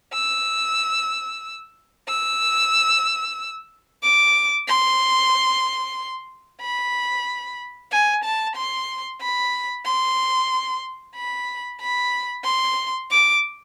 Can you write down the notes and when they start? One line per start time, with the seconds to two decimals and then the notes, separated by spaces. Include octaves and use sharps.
0.13 E6
2.08 E6
4.03 D6
4.68 C6
6.62 B5
7.92 G#5
8.24 A5
8.57 C6
9.21 B5
9.86 C6
11.16 B5
11.81 B5
12.45 C6
13.11 D6